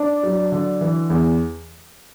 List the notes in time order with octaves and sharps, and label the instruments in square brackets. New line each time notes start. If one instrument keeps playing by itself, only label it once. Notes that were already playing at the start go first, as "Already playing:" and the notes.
Already playing: [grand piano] D4 [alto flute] D5
[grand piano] F#3
D3
E3
E2